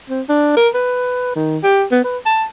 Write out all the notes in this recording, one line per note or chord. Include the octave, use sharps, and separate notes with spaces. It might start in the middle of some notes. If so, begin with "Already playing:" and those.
C4
D4
A#4
B4
D#3
G4
B3
B4
A5